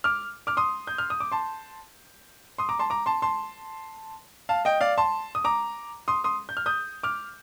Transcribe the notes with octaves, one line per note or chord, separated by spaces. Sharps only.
D6 F6
D6 F6
C6 D#6
G6
F6
D#6
D6
A5 C6
C6 D#6
A#5 D6
A5 C6
A#5 D6
A5 C6
A5 C6
F5 A5
D#5 G5
D5 F5
A5 C6
D#6
A#5 D6
C6 D#6
C6 D#6
G6
F6
D#6 G6
D6 F6